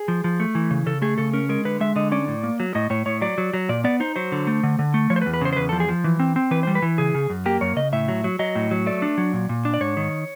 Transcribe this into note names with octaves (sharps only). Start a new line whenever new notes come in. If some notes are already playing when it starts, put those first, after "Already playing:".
Already playing: G#4
F3
F3
A3
E3
C#3
C#3 A4
A3 G#4
C#3 A4
C#4 A#4
G#3 A#4
D3 B4
G#3 E5
D3 D#5
C#4 D5
A2
A#3
F#3
A2 D#5
A2 C#5
A2 C#5
F#3 D5
F#3
F#3
A#2 D5
B3 D5
D#4 C5
F#3 C5
D3
A3
D3
D3
A3
F3 C#5
C5
B4
E2
B4
C#3 C5
C5
E2 B4
A4
F3
G#4
F3
E3
C4
C4
E3 B4
C5
G3
B4
E3
C#3 G#4
C#3
F#2
A#3 G4
F#2 C#5
C#3 D#5
A2 E5
F#3
F#3
F#3 D#5
A2
F#3
A3 D5
D4
F#3
A#2
A#2
D4
D5
G#2 C#5
D#3